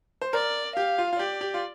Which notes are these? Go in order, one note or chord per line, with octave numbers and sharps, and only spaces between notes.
C5
A#4 D5
G4 F5
F4
F4
G4 D5
G4
F4